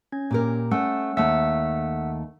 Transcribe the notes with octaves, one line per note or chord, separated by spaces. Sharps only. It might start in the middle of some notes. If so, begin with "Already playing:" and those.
C#4 G#6
A#2 G4 A#4
A3 C#4 F#5 E6
D#2 A3 E5 F#5 E6